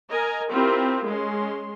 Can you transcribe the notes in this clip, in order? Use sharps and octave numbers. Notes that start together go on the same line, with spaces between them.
A#4 D#5 G#5 A#5
C4 E4 F4 G4 A#4
G#3 C#4 C6